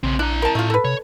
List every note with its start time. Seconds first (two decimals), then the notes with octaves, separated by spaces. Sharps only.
0.03 A#1 C#3 C4
0.19 D4 E4 A#5
0.42 A#4 A5
0.55 A2 A3 F4
0.70 A4 B4
0.85 C3 C#5